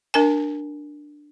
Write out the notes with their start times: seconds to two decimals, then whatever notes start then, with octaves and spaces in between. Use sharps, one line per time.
0.14 D4 A#4 G#5